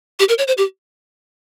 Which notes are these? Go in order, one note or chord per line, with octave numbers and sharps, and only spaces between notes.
G4
A#4
C#5
C5
G4